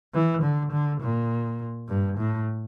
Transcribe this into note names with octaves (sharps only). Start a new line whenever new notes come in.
E3
D3
D3
A#2
G2
A2